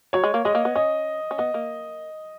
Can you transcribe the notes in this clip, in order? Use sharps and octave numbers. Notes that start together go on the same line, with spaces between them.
F#3 C#5
G#3
A#3
G#3 D#5
A#3
B3
C#4 D#5
C#4
B3 D#5
A#3